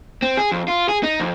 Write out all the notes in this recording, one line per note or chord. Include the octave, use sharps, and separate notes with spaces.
C4
G#4
F2
F4
G#4
D#4
F2